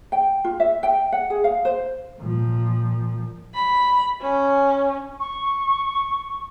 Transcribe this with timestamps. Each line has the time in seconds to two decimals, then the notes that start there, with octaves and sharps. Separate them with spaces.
0.12 G5
0.44 F4
0.60 E5
0.83 G5
1.12 F#5
1.30 G#4
1.44 F5
1.65 C5
2.21 A#2 F3
3.54 B5
4.21 C#4
5.20 C#6